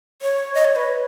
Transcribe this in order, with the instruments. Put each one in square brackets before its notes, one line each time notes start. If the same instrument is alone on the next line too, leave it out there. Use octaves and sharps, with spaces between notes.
[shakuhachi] C#5
D#5
C#5
B4